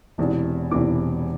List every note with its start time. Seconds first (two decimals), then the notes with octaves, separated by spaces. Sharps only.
0.18 E1 E2 C3 E3
0.71 E1 E2 C3 E3 D6